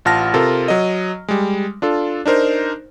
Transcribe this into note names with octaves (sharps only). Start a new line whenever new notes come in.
A1 F4 F#5 A5 F6 A#6
C3 F4 A4 A#4
F#3 D#5
G3 G#3
D4 F4 A4
D4 D#4 A#4 C5